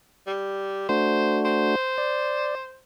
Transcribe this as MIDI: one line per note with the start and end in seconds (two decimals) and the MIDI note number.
0.27 0.88 55
0.89 1.76 57
0.89 1.76 62
0.89 1.76 66
0.89 1.40 72
1.45 2.80 72
1.98 2.55 74